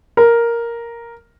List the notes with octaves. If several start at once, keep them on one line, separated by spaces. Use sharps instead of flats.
A#4